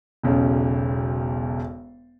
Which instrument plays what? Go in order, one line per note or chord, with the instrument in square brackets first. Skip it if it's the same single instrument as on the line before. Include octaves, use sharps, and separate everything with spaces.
[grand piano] E1 B1 C#3